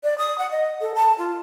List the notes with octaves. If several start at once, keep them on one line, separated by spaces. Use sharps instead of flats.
D5
D#6
F#5
D#5
A4
A5
F4